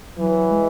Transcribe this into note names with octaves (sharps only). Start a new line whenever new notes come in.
E3 F#3
G#3